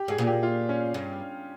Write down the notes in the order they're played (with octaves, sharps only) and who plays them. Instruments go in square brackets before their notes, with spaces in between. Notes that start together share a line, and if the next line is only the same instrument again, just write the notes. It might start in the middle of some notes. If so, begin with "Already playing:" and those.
Already playing: [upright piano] G4
[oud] G#2 [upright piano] G#4
[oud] A#2
[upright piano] G4
F4
C#4
[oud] G2